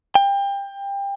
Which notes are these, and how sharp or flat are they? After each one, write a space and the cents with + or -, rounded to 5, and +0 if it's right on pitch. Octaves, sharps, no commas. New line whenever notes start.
G5 +25